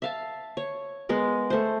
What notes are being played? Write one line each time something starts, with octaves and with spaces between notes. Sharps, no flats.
E5 F5 A5
C#5
G#3 B3 A#4
A3 C5